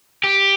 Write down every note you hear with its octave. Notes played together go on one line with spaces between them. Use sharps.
G4